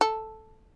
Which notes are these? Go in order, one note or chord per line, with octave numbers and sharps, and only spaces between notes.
A4